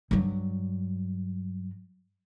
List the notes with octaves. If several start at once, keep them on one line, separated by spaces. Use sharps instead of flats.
G2 F#3